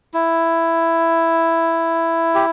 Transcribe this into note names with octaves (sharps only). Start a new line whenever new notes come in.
E4
G4